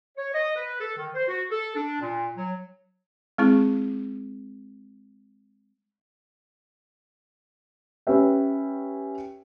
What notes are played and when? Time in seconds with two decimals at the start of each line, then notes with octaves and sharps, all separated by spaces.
0.17 C#5
0.34 D#5
0.56 B4
0.81 A4
0.97 D#3
1.14 C5
1.28 F#4
1.50 A4
1.76 D4
2.01 A#2
2.37 F#3
3.38 G#3 C4 E4 G#4
8.07 C#4 G4 B4 E5 G5